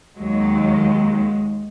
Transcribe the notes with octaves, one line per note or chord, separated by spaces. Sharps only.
D#2 D#3 F#3 G#3